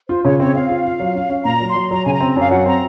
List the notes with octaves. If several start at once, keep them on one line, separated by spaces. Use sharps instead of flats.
F4 C5
C#3 C#5
C4 C#5
C4 F5
F4
F4
F#3
C#4
C#4
A#2 A#5
F#3
C6
F#3
F#3 A#5
C#3 G#5
A#5
C4
F#2 F5
F#3 F#5
C4 A#5